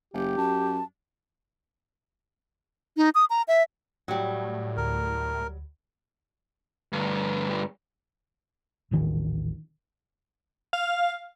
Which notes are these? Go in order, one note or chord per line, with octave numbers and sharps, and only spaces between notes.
F#1 G4
F#2 A5
D#4
D#6
A#5
E5
A2 F#3 G3
D2 A#4
D2 G2
D#1 A1 D#3
F5